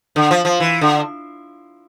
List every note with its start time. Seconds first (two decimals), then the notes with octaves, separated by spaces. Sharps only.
0.16 D3
0.31 F3
0.45 F3
0.60 E3
0.81 D3